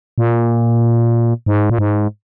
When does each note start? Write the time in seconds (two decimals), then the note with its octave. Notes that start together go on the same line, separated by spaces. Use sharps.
0.18 A#2
1.46 G#2
1.70 A#2
1.79 G#2